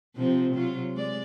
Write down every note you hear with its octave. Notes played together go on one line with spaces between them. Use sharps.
C3 F3 C4
C3 F#3 F4
G#3 D5